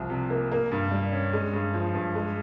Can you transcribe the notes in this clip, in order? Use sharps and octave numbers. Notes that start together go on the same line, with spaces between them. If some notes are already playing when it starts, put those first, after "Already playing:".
Already playing: C2 F3
C3
A#3
A#3
G2
G3
C#4
G#3
G2
F3
G2
G#3